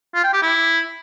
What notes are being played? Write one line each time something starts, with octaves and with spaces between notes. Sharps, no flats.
F4
G5
G4
E4